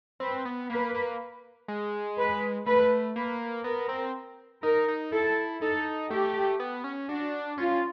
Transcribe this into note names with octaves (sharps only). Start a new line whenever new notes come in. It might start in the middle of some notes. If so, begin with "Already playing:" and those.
C4 B4
B3
A#3 B4
A#3
G#3
B4
A3 B4
A#3 B4
B3 A#4
C4
D#4 A#4
D#4
E4 A4
D#4 A4
A3 G4
B3
C#4
D4 F#4
C#4 F4